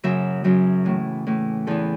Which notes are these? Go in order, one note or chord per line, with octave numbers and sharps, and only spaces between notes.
F#2 C#3 F#3 E5
F#2 C#3 F#3
A2 E3
A2 E3
E2 E3 A4